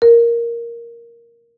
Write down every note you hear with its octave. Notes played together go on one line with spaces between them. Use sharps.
A#4